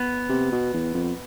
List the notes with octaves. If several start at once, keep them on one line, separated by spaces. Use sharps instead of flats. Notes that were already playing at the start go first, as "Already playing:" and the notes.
Already playing: B3
C3
B2
E2
F2